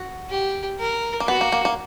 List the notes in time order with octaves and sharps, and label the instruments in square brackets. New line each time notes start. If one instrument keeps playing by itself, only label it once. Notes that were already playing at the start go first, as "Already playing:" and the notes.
Already playing: [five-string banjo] F#4
[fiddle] G4
A#4
[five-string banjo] A#3
[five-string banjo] B3 [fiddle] F#4
[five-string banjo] A#3
A#3
A#3